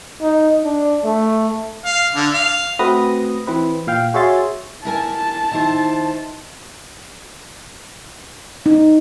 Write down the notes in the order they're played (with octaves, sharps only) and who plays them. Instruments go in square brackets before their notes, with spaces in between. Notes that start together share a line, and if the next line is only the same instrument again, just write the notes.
[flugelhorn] D#4
D4
A3
[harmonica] F5
D3
F5
[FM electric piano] A3 C4 F#4 B4 D#6 A#6
E3 C4 B4
A#2 F5 G5
F#4 G#4 C#5 E5 C6 A6
[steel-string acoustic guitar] E4 A#4 G#5 [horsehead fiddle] A5
[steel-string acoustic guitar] D#3 E4 C5
[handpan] D#4